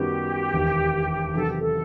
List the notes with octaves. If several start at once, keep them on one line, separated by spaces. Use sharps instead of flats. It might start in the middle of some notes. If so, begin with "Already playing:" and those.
Already playing: F#2 D#3 G3 B3 F#4 G4
E1 D#2 D#3
E2 C3 D#3 F#3 A4
G4
A4